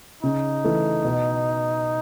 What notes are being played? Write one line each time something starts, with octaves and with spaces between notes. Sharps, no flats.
C#3 D#4
E3 A3
B2